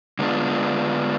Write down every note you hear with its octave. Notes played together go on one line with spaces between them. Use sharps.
D3 G#3 B3 D4 F4